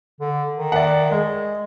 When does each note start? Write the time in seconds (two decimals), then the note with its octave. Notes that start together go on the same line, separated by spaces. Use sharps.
0.20 D3
0.56 D#3
0.72 D5 E5 F#5
1.11 G#3 G#4